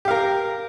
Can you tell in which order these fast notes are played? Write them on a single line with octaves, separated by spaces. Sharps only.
G4 F5 A#4